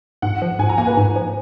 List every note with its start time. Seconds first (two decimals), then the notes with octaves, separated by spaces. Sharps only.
0.22 G#2 F#5
0.42 F3
0.59 G#2 G#5
0.69 A#5
0.78 A#3 G#5
0.87 B4
0.97 G#2
1.16 F3